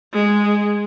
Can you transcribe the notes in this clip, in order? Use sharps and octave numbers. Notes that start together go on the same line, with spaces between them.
G#3